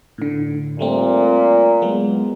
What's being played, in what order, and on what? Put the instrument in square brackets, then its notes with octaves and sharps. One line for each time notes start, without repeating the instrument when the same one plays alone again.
[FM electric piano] A2 D3
[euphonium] A#2 [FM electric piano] G3 A3 C4
[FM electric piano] F#3 G#3 B3